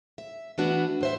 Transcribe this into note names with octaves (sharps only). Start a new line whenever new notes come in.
E5
E3 A3 B3 D4 F#4
A2 C5 E5